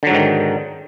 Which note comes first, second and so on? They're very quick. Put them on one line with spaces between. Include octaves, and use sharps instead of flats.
D3 F#3 G#2 D#3